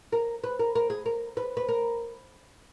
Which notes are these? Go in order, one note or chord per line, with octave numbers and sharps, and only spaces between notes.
A#4
B4
A#4
A#4
G#4
A#4
B4
B4
A#4